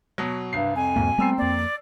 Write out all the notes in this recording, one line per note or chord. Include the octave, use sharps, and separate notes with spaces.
B2 F#3
C2 G2 C7
F2 G#5
B1 E2 G#2 A#3
G3 A3 B3 C4 A#5 E6 C7
F2 A#3 D5